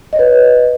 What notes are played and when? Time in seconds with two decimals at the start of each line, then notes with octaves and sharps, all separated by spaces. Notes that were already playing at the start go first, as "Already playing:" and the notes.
0.13 D#5
0.16 C#5
0.19 B4